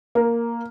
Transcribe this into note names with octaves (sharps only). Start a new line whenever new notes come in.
A#3